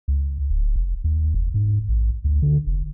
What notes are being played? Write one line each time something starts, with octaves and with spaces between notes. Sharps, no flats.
C#2
D1
F1
D#2
F1
G#2
A1
D2
D3
F1